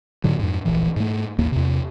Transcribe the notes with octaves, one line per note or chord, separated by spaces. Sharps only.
G#2 D3 F#3
F2 G#2
D1 A#1 E3
G#2 A3
A1 D#2 A#3
E2 C3